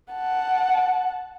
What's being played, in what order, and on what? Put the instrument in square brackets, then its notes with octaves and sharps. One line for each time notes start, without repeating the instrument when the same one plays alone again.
[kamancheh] F#5 A5